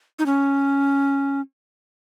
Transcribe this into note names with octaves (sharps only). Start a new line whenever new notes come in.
D#4
C#4